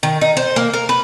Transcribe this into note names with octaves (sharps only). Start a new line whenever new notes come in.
D#3
D#4
C5
A#3
A#4
B4